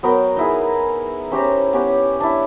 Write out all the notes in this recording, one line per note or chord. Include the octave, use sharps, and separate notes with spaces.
F#3 B3 A#4 G5
D#4 E4 G#4
C#4 G4 C5 A#5
B3 C#4 G4
D4 E4